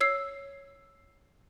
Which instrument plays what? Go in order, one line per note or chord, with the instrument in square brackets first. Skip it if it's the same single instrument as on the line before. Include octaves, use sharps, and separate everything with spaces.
[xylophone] C#5 E6 C7